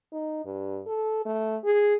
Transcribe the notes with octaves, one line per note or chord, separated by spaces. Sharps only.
D#4
G2
A4
A3
G#4